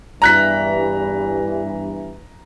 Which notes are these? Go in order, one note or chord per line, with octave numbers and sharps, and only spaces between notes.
E2 G2 E3 A#5 F#6 B6